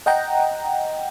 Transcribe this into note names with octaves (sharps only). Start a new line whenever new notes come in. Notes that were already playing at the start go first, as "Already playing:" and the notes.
D#5 F#5 G5 A#5